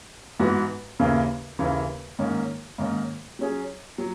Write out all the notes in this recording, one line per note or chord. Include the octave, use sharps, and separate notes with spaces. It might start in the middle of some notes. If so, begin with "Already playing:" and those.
G#2 E3 B3 F#4
D#2 C#3 E3 A#3 E4
D#2 C#3 E3 A#3 E4
G#2 D#3 A#3 C#4
G#2 D#3 A#3 C#4
F#3 C#4 G#4
F#3